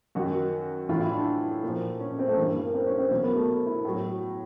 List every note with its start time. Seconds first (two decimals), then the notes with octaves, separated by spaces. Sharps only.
0.15 F#2 D#3 F#3 F#4
0.89 A2 E3 F4
1.01 E4
1.14 D4
1.63 A#2 F3
2.00 C#4
2.19 C4
2.28 A3
2.37 G2 E3 A#3
2.50 A#3
2.74 C4
2.87 C#4
2.99 C4
3.11 E2 B2 F#3 A#3
3.23 B3
3.36 A3
3.66 E4
3.85 A2 F#3